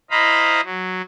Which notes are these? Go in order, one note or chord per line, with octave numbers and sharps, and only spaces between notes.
E4 C5 D#5 F5 A#5 B5
F#3